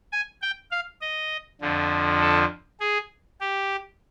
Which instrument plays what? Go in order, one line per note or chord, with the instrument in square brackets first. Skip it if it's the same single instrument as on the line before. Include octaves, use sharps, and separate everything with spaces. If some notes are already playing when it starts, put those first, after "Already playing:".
[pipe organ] G#5
G5
F5
D#5
F2 D3 F3
A4
G#4
G4